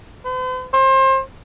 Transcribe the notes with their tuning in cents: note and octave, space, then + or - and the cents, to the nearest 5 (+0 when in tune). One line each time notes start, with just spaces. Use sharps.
C5 -45
C5 +30